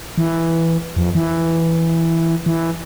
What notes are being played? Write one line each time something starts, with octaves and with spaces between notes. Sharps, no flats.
E3
F2
E3
E3